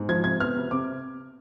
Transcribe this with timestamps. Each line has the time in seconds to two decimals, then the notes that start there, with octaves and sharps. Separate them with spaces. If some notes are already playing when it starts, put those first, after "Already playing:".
Already playing: G#2
0.09 F3 G#6
0.24 C3 G#6
0.40 B3 F6
0.56 C3
0.71 C3 D6